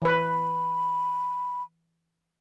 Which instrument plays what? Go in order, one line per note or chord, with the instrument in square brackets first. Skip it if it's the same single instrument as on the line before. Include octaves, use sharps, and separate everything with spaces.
[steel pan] E3 B4 [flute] B5